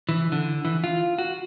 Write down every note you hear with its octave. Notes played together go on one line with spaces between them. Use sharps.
E3
D3
E3
F4
F#4